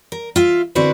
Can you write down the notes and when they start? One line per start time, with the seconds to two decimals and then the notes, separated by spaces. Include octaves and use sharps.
0.12 A#4
0.36 F4 E5
0.75 D3 C4 E4 F#4 B4